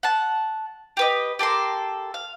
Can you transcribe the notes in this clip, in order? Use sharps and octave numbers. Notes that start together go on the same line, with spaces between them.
F#5 A5
G4 B4 D#5
G4 A4 A#4 C6
F5